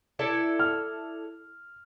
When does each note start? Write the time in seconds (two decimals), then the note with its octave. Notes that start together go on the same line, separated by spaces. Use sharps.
0.19 E4 A4 D5
0.59 F6